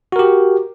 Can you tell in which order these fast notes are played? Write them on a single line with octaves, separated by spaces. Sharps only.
F#4 A#4 G4